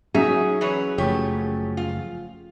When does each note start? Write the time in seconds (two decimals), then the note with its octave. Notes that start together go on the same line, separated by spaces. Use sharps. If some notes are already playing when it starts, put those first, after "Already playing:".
0.15 F#3 C#4 D#4 G#4 E5
0.61 E3 B4 C#5
0.98 F#1 F3 A3 G4 C#5
1.77 F4